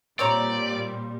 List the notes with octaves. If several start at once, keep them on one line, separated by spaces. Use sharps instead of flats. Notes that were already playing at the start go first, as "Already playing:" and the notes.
A#2 G3 C4 C#5 D5 A#5